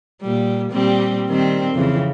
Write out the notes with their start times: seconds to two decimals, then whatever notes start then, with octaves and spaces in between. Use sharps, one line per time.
0.22 A#2 G3
0.72 A#2 G3 C4
1.28 D#3 G3 C4
1.74 F2 C#3 E3